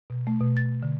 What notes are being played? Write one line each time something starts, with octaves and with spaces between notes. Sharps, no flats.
B2
A3
B2
A6
D3